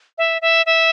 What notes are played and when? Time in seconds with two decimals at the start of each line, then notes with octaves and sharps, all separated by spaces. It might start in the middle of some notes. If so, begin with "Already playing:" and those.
0.18 E5
0.42 E5
0.66 E5